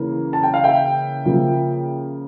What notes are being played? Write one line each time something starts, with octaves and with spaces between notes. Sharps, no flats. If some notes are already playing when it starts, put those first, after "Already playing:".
Already playing: C#3 E3 A#3
A5
G5
F5
E5 G5
C#3 F3 A#3